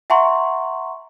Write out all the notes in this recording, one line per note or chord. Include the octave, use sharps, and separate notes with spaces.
E5 F#5 G#5 A#5 C6 C#6